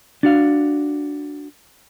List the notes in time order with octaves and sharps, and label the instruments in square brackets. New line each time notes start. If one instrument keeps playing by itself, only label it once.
[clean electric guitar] D4 F#4 F5